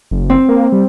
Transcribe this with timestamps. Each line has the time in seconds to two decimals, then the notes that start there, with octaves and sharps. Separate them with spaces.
0.11 F#1
0.30 C4
0.49 A#3
0.72 G3